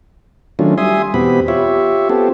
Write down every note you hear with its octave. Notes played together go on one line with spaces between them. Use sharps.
D#3 F#3 A3 C#4 D4 F4
G3 E5 G#5 C6 D#6
E2 B2 B3 C4 G4 B5
F4 G4 C#5 E5
B3 C4 F4 G4 A4